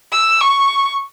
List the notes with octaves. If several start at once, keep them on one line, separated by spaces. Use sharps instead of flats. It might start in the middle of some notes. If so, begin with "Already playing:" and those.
E6
C#6